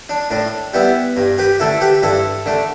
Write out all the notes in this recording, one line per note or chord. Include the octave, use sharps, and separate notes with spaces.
D4
A2 D4
G3 B3 E4
G2
G4 B4
D3 A3 E4 A4
G4 B4
G2 E4 A4
D3 A3